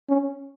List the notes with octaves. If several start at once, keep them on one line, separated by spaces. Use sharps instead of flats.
C#4